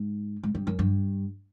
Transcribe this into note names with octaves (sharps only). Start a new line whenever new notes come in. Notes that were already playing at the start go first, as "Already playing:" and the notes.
Already playing: G#2
G#2
G2
F#2
G2